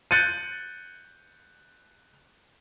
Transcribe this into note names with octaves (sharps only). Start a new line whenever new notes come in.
F#6 G6 A6 C#7 D#7